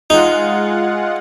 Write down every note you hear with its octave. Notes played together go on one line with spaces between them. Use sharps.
G#3 D#4 F4 F#5